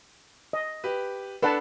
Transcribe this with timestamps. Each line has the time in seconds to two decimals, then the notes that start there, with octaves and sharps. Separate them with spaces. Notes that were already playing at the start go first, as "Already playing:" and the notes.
0.53 D#5
0.84 G4 B4
1.43 D4 A4 B4 F#5 A5